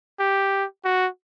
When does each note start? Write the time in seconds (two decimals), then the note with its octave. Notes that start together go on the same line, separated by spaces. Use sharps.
0.20 G4
0.85 F#4